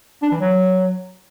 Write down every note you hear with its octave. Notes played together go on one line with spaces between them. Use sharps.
D4
E3
F#3